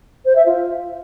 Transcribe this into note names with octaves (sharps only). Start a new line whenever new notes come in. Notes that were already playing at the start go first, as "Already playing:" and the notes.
C5
E5
F4